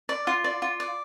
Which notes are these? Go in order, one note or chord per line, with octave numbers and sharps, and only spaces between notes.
D5
F4
D5
F4
D5